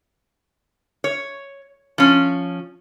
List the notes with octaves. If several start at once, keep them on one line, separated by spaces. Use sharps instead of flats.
C#5
F3 C#4